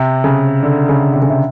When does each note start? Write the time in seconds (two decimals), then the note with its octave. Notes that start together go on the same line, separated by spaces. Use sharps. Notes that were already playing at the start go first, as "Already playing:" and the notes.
Already playing: C3
0.24 C#3
0.63 D3
0.89 C#3
1.13 C3
1.22 C#3
1.30 C3